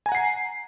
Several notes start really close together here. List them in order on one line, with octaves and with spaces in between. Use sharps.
G#5 A#5 F#5 C7